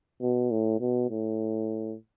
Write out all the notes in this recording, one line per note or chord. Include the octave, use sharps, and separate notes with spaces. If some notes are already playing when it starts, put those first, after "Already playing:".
B2
A2
B2
A2